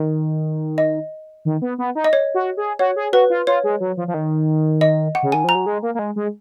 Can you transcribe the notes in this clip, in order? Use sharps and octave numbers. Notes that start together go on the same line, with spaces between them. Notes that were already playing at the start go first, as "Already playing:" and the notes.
Already playing: D#3
D#5
D#3
B3
B3
D#4
D#5
C#5
F#4
G#4
F#4 C#5
G#4
F#4 B4
F4
F4 C#5
G#3
F#3
F3
F3
D#3
D#5
F#5
C#3
D#3 G#5
F3 A#5
F#3
G#3
A#3
A#3
G#3
G#3